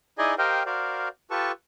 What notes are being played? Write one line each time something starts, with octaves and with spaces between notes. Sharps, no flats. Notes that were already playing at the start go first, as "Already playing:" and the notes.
D#4 E4 G#4 D5 D#5 G#5
G4 A#4 C5 D#5 F5 G5
F#4 A#4 C5 D5 F5
F4 G4 A4 B4 A5 C#6